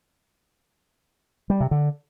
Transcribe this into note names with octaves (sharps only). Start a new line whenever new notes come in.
G3
C3
D3